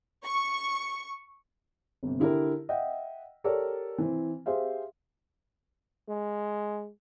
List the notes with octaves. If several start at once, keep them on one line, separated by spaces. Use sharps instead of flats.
C#6
G1 C3
D3 E4 G4 A#4
D#5 E5 F#5 G5
G4 A4 A#4 C#5 D5
E3 C4
G4 G#4 C5 E5 F5
G#3